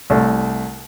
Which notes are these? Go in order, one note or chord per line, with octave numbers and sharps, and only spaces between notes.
C2 A3